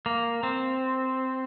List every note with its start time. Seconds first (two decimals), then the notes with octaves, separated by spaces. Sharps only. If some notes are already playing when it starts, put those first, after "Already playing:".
0.06 A#3
0.43 C4